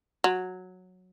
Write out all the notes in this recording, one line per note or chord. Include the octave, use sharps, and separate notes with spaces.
F#3